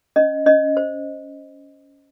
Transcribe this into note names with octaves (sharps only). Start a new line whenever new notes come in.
C#4 D#5
C#4 D#5
C5